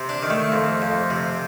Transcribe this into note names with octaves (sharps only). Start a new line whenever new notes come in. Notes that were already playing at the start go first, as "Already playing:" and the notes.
Already playing: C3
D4
D#3
A3
F2
F2
C3